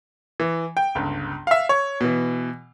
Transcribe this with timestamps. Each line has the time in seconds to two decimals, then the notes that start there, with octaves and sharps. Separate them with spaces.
0.40 E3
0.77 G5
0.95 G1 C#2
1.47 E5 F5
1.69 C#5
2.01 B2 E3